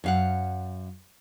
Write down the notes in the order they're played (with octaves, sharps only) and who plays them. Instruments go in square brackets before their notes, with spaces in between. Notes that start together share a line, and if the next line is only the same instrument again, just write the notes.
[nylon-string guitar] F#2 F5 F#5